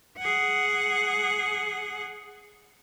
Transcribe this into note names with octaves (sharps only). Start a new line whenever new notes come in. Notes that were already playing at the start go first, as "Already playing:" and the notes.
G#4 F#5